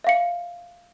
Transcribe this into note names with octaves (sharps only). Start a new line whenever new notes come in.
E5 F5 C#7